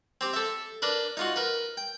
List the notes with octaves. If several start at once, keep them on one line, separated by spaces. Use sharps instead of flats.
C4 G4
A4 E5
D4 A#4 B4
D#4 F4 F#4
A#4 B4
G5